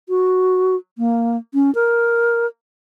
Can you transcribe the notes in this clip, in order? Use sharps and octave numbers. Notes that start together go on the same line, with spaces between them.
F#4
A#3
C#4
A#4